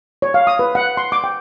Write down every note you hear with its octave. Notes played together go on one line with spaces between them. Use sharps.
C#5
F5
D#6
B4
F#5
C6
D6
G5